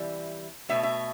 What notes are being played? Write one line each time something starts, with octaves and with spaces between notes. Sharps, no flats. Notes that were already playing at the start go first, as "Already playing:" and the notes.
Already playing: C3 E3 G3
B2 A3 E5
E5